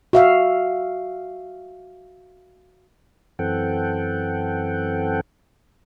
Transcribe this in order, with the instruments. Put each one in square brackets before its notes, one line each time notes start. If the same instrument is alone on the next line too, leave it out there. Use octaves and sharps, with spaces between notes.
[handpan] F#4 E5 F5
[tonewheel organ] F#2 E3 C4 A4 F#5 G5